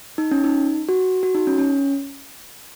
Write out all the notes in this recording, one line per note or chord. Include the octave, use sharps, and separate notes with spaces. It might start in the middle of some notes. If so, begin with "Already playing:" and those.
D#4
C#4
D#4
F#4
F#4
D#4
C#4
C#4